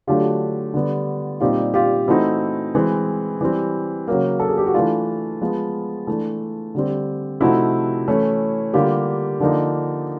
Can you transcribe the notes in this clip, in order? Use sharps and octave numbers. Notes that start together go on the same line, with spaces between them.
D3 F#3 A3 D4 F4 G4
D3 G3 B3
A#2 G3 C4 D#4 F4 G4
F4 G4
E3 A3 C4 D#4 E4 F#4
E3 G#3 C4
E3 G3 C4
C#3 F#3 A#3
A4
G#4
G4
F#4
E3 A3 D4 F4
F3 G#3 B3
E3 A3 D4
D3 G3 C4
C3 F3 A3 C4 D#4 E4 F#4
E3 A3 C#4
D3 G3 A#3 F4 G4
D3 F3 A#3 D#4